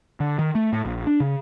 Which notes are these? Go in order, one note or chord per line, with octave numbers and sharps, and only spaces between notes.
D3
D#3
A3
A2
A#1
D4
C#3